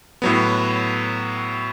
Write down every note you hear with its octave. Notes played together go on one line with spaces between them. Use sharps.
A2 F#3 B3